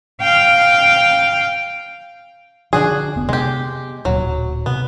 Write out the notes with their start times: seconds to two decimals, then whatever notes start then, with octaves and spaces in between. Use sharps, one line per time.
0.22 F5 G5
2.73 D3 D#3 F3 D4 F#4 G#4
3.16 F1 B3
3.29 C3 G#3 B3 G4
4.05 D1 A#2 F#3
4.66 C3 B3